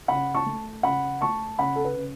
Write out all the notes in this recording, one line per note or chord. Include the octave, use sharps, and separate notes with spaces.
C#3 F#5 B5
A5 C#6
A3
C#3 F#5 B5
A3 A5 C#6
C#3 F#5 B5
A4
B4
C#3